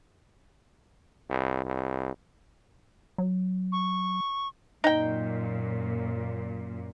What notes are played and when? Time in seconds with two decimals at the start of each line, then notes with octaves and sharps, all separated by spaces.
1.30 C2
1.65 C2
3.18 F#3
3.72 C#6
4.84 F#2 A#2 D#4 G5